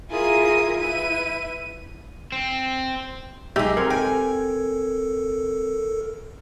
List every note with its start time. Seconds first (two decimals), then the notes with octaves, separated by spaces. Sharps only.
0.11 E4 F4 G#4 A#4 D#6
0.77 E4 B4 D#7
2.32 C4
3.56 B1 G#3 D#4 G4 G#4 E5
3.77 C4 A#4 C6 G#6
3.90 A4 A#4 G5 G#5